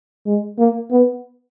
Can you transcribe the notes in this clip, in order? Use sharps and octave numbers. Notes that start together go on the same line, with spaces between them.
G#3
A#3
B3